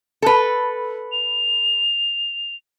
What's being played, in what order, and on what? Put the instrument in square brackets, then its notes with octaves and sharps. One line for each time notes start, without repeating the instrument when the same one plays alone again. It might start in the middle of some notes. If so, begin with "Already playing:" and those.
[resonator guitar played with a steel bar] A4 B4
[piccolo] F7